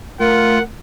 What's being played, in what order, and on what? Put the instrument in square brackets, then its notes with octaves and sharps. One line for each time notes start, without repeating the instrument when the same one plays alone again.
[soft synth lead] A3 [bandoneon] F4 [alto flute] A#4 [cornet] F#5